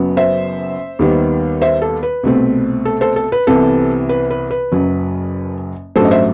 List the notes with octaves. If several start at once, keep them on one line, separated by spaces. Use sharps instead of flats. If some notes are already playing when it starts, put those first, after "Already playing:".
Already playing: F#1 F#2 F#3 B3
C5 E5
D#2 D#3 G3 B3
C5 E5
A4
B4
C2 B2 A3 C4
A4
A4 C5
A4
B4
C2 C3 E3 B3 A4
B4
B4
B4
F#1 F#2 F#3
A1 G2 F#3 A3 A4 C5
D#5
C5 E5